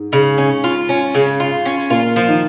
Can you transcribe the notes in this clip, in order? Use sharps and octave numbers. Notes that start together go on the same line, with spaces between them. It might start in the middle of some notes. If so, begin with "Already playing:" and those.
Already playing: G#2
C#3
C#4
F4
C#4
C#3
F4
C#4
A#2 A#3 F4
F3
D#3 D#4